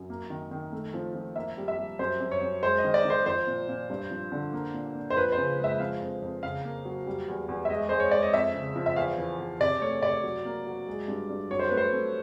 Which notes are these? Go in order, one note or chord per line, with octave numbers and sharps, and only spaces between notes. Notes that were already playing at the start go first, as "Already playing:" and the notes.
Already playing: F#2
A#3
D#3
D#3
A3
F3
F3
A#3 E5
G3
E5
G3
F#2 C5
F#2
C#5
F#2
G#3 C5
D#5
D#3
D5
D#3 C5
F3 C5
A#2
A#2
G2
F3
D3
A#3
A#2
A#2
C5
F3 B4
C5
C#3
G#3 E5
F3 F5
F2
F2
C#3 F5
A#3
F#3
G3
E2
E2
E5
G#3 D#5
G#3 C5
C#5
G#3 D5
D#5
F2 E5
C#3
F3
E5
E2 F5
E3
E2
C3 D5
A3 C#5
C3 D5
F#3
A#3
F#3
G#3
G2
G2
F#3 C#5
C5
A3 B4
C5
A3